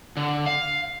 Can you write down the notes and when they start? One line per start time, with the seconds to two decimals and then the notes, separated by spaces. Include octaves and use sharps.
0.17 D3
0.46 F5